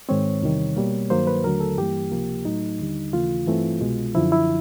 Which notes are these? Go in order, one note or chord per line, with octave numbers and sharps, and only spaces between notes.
G#2 D#3 G#3 C4 C#5
E2 C3 D#3 G3
B2 G3 A#3
G2 D#3 F#3 A#3 C5
B4
D#2 D3 F#3 A3 A#4
A4
G2 E3 G3 A#3 G4
C#2 C3 F3 A#3
A2 F#3 A3 D#4
D#2 D3 G3
D#2 C#3 E3 A3 F4
G2 E3 A3 C4
C2 B2 G#3
F#2 D3 F3 E4
E4